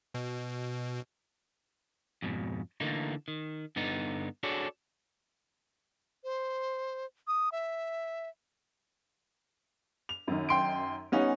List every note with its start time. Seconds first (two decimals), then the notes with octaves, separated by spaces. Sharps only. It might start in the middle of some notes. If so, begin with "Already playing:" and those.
0.14 B2
2.22 F2 G#2 B2
2.80 D3 E3 A3 A#3 D#4
3.28 D#3
3.76 G2 D3 B3 D#4
4.43 D4 F#4 G#4 A4 C#5 D5
6.24 C5
7.28 D#6
7.52 E5
10.09 F7
10.28 F#2 D#3
10.49 G5 C6 D7
11.12 G3 B3 C#4 D#4 F#5 G#5